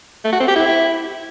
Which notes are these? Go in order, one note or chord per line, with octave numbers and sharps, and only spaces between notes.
A3
F#4
C4
G4
E4